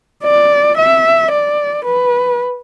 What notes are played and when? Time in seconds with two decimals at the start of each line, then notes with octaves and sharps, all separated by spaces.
0.24 D5
0.78 E5
1.32 D5
1.86 B4